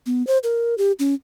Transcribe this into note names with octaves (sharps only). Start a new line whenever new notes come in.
B3
C5
A#4
G4
C#4